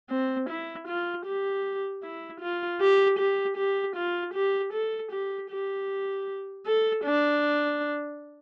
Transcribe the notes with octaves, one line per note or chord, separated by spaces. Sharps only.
C4
E4
F4
G4
E4
F4
G4
G4
G4
F4
G4
A4
G4
G4
A4
D4